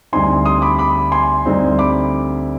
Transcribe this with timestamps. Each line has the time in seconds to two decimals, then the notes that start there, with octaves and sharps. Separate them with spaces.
0.13 D2 D3 G3 C4 D#4 G#5 C6
0.45 C6 D#6
0.62 B5 D6
0.78 B5 D6
1.11 G#5 C6
1.46 D2 D3 G3 C4 D#4
1.79 B5 D6